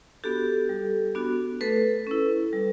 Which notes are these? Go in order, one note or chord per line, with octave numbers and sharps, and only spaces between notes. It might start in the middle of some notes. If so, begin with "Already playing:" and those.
B3 D4 F#4 G4 A4
G3
B3 D4 F#4
A3 A4 B4
C#4 E4
G3